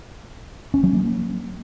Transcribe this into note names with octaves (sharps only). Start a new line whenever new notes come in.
C#4
F#3
A#3